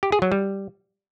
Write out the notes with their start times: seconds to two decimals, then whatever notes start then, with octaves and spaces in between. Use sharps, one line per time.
0.03 G4
0.12 G#4
0.22 F#3
0.32 G3